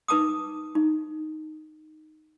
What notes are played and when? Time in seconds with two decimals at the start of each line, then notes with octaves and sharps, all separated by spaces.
0.08 D#4 B4 A5 D6 D#6
0.75 D#4